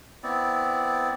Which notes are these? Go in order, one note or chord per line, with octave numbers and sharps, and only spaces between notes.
B3 C4 E4 D5